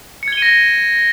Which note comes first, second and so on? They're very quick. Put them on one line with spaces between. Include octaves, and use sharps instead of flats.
C#7 G#6 G7 D#7 A#6